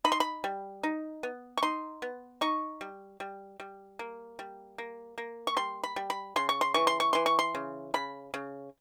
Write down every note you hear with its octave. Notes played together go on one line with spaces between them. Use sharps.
D#4 B5
C6
B5
G3
D#4
B3
C#6
D#4 C6
B3
D#4 C#6
G3
G3
G3
A#3
G3
A#3
A#3
C#6
G3 C6
B5
G3
B5
C#3 C6
C#6
C6
E3 C#6
C6
C#6
E3 C6
C#6
C6
C#3
C#3 B5
C#3